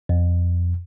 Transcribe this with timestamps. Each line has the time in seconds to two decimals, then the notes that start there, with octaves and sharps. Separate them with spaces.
0.09 F2